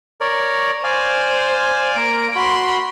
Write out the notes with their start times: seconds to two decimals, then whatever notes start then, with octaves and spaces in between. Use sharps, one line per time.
0.21 A#4 C#5 D5
0.84 C5 D5 F5 G#5
1.97 A#3 A#4 D7
2.35 F#4 B5 C6